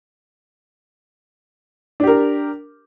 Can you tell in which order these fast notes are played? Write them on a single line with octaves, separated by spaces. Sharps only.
D4 G4 A#4